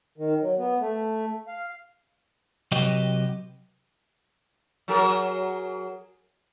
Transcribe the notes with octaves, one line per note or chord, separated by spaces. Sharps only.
D#3
F#3
B3
A3
F5
C3 F#3 F#4 G4 B4 D#5
F#3 G#4 A#4